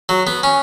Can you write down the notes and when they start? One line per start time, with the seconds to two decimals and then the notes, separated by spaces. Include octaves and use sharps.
0.09 F#3
0.27 B3
0.43 C#4